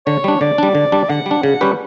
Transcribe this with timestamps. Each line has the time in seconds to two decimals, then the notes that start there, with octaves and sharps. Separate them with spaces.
0.06 D3 C#5
0.24 G3 D4
0.41 D3 D5
0.58 G3 D4
0.75 D3
0.92 G3 D4
1.09 D3 F#5
1.26 G3
1.31 D4
1.43 C#3
1.61 G3 C#4 G4 B4